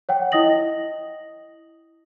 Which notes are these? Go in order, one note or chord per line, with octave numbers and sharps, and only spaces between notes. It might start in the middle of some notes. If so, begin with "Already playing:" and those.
C#5 F#5 G5
E4 D#5 D#6 A#6 F#7